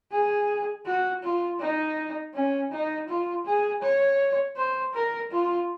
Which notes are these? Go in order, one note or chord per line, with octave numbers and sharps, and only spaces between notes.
G#4
F#4
F4
D#4
C#4
D#4
F4
G#4
C#5
C5
A#4
F4